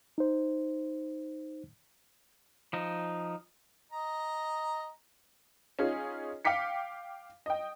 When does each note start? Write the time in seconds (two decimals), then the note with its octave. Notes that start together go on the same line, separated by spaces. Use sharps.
0.18 D#4 C5
2.73 F3 D#4
3.92 D#5 A#5
5.79 C#4 D#4 F4 G#4
6.45 F5 G5 D6 B6 C#7
7.46 D#5 G5